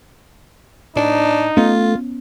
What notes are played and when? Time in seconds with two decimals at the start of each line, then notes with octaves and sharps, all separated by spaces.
0.96 A2 D4 D#4
1.57 A3 B3 C#4 F4